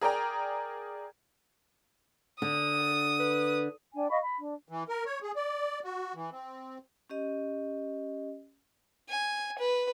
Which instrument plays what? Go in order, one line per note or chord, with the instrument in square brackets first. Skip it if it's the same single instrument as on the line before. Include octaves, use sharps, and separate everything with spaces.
[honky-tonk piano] G#4 A#4 D5 G5 A#5
[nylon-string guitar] D3 [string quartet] D#6
[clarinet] B4
[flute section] D4 G5 G#5
D#5 F5 B5 C#6
B5
D4
[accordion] E3
A#4
C#5
G#4
D5
F#4
E3
C4
[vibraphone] C#4 G4 D#5
[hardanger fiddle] G#5
B4